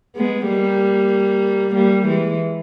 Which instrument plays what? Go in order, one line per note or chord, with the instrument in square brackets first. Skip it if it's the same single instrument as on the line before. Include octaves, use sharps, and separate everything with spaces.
[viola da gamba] G#3 B3
G3 A#3
G3 A#3
E3 G#3